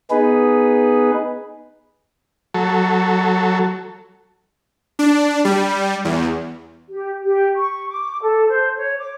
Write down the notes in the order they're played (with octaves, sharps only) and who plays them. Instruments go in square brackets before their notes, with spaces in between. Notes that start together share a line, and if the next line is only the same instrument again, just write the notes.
[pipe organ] B3 D#4 G#4 B4
[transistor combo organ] F#3 A4
[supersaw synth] D4
G3
E2
[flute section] G4
G4
C#6
D6
A4
C5
C#5
D6